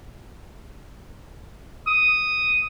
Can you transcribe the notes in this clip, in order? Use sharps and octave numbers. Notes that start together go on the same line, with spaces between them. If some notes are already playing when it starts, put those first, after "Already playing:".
D#6